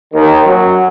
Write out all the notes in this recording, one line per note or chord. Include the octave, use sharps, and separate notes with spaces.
D#2 D#3
F#2 F#3